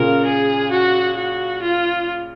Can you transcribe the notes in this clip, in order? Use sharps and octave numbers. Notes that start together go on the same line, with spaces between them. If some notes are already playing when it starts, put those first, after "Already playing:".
Already playing: A#2 C#3 A#4
G#4
F#4
F#4
F4